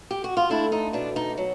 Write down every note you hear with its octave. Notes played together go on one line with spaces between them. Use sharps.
G4
F#4
F4
A3 D4 E4
D#4
B2 D4
D#4
F#3